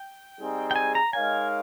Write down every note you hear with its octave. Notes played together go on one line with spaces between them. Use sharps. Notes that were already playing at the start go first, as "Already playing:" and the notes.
Already playing: G5
G3 C4 D#4 G#4
G5
G#5
A#5
G#3 D#4 A#4 C#5 F5 G#5